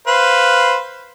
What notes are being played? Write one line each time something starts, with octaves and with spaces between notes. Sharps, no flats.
B4 C5 F5